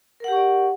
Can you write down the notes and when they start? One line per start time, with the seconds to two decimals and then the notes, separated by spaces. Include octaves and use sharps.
0.20 A#4
0.24 F#5
0.28 G4
0.32 C#6
0.36 D5